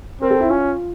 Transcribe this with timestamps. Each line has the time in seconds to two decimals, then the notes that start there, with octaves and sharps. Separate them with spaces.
0.21 C4 A#4
0.31 A4
0.40 E4
0.50 C#4 F4